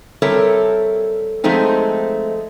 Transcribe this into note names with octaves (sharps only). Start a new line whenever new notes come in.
G3 C4 A4 A#4 C#5 E5
F3 G#3 A3 C4 D#4